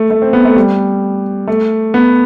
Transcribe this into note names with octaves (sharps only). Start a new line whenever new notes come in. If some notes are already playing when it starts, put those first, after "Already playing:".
Already playing: A3
A3
C4
B3
A3
G3
A3
B3